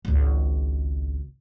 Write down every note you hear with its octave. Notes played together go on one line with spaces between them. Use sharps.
G#1 C#2